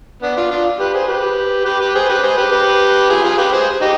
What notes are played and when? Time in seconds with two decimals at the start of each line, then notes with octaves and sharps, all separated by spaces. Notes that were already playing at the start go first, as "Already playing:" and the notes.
0.23 B3 D4
0.36 D4 F4
0.51 D4 F4
0.79 G4 B4
0.94 G#4 C5
1.08 G4 B4
1.65 G4 B4
1.80 G4 B4
1.95 G#4 C5
2.09 G4 B4
2.23 G#4 C5
2.37 G4 B4
2.51 G4 B4
3.10 F4 G#4
3.23 F4 G#4
3.38 G4 B4
3.52 G#4 C5
3.82 D#4 G4